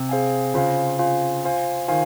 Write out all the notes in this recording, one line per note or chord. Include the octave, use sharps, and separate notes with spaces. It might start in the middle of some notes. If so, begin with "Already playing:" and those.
Already playing: C3
G#4 C5 F5 G#5
C#3 F4 C5 F5 G#5
F4 C5 F5 G#5
F4 C5 F5 G#5
D#3 F4 C5 F5 G#5